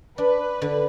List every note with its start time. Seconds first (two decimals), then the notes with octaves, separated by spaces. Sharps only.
0.18 D4 B4
0.62 D3